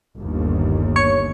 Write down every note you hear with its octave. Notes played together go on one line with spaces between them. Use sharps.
G1 D#2
C#5 C#7